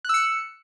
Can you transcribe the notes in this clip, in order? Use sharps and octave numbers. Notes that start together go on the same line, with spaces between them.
E6 F#6 C#7